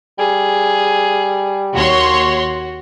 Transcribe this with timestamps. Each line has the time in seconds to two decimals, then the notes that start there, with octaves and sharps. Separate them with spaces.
0.19 G3 G#4
1.74 D#2 F#4 C#5 C6